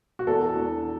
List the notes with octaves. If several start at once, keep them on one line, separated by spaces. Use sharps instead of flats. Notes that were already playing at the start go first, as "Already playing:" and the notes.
F#4
E2 A4
E3 D4